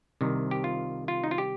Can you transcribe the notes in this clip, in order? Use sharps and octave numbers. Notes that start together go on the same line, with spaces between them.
C2 C3 D#3
G4
F4
F4
D#4
F4
G4